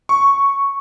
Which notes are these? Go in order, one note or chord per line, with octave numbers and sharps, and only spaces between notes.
C#6